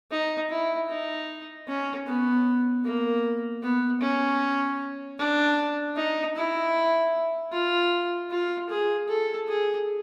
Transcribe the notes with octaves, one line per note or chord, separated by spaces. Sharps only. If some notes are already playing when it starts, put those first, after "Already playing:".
D#4
E4
D#4
C#4
B3
A#3
B3
C#4
D4
D#4
E4
F4
F4
G#4
A4
G#4